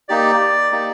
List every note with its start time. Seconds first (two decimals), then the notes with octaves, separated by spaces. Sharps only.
0.09 A#3 D#4 G4 D5
0.72 A#3 D#4 G4